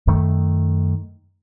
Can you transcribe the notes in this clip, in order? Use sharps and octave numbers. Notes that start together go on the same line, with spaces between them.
F#2 D#3 A3